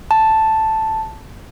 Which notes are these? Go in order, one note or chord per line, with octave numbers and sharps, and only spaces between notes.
A5